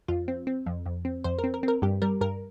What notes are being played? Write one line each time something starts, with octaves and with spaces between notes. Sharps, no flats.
F2 F4
C4
C4
F2
F2
C4
F2 C5
A#4
C4
A#4
C4
A#4
G2 G4
G3 A#4
G2 A#4